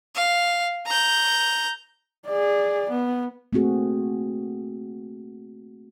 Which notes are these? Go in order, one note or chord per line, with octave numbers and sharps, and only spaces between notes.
F5
A#5 G6
G#4 D5
B3
A3 A#3 C4 F#4 G#4